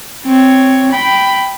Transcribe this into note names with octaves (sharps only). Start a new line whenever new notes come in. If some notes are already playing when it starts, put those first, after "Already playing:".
C4 C#5
G5 B5